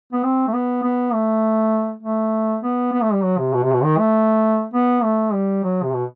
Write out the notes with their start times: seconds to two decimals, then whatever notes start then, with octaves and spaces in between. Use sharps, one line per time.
0.12 B3
0.23 C4
0.48 A3
0.53 B3
0.83 B3
1.13 A3
2.03 A3
2.63 B3
2.93 B3
3.03 A3
3.13 G3
3.23 F#3
3.38 C3
3.53 B2
3.63 C3
3.73 B2
3.83 D#3
3.98 A3
4.74 B3
5.03 A3
5.33 G3
5.63 F#3
5.83 C3
5.93 B2